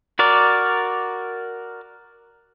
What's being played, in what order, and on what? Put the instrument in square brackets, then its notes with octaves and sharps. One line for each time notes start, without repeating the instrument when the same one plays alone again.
[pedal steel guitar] F#4 A#4 D5